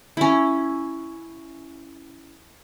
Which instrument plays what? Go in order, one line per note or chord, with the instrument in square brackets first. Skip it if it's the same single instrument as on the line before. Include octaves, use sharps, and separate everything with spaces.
[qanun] C#4 E4